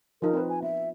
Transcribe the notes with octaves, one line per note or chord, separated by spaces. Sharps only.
F3 D#4 G#4 A#4
C4 F4 B4
G#5
B3 E5